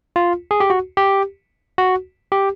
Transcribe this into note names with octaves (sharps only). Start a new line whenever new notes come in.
F4
G#4
G4
F#4
G4
F#4
G4